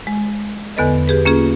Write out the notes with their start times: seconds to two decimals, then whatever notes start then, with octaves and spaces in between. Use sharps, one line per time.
0.07 G#3
0.77 E2 D3 B3 A4 B4 D#5
1.07 G4 G#4 B4
1.25 A#3 C#4 F4 G#4